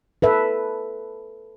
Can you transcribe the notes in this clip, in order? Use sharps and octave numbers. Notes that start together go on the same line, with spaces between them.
A4 B4 E5